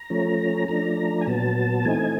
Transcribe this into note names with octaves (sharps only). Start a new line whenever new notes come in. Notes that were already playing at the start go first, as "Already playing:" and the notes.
Already playing: A#5
F3 A3 C#4
F3 A3 D4 A#5
G#5
A#2 F#3 B3 A5
E3 A3 C4 D#4 G#5